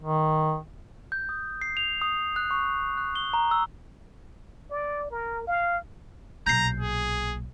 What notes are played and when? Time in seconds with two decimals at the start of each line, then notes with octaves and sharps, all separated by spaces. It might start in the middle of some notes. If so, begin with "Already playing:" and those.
0.02 D#3
1.12 G6
1.29 D#6
1.62 C7
1.77 F7
2.02 D#6
2.36 F#6
2.51 C#6
2.97 F#6
3.16 G7
3.34 A#5
3.51 E6
4.71 D5
5.11 A#4
5.47 F5
6.46 B1 A#2 A#5 G6 C7
6.80 G#4